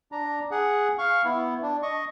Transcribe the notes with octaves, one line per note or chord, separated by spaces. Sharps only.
D4 A#5
G#4 F#5
F5 C#6
B3 E4
D4
D#5 C#6